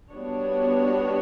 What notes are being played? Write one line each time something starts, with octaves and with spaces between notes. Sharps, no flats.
G3 B3 D4 F#4 C#5